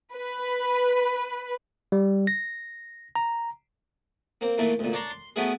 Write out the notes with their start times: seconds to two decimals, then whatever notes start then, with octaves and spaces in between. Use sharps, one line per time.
0.14 B4
1.92 G3
2.27 A#6
3.15 A#5
4.41 A#3 C4
4.58 A#2 E3 A3 A#3
4.79 D2 A#2
4.93 D4 C#5 D5 A5 A#5 C6
5.11 C6
5.36 F#3 A3 B3 C#4 E4 G#4